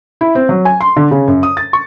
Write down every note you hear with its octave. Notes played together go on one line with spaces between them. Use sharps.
E4
C4
F#3
G#5
C6
D3
C#3
F#2
D#6
A6
C#6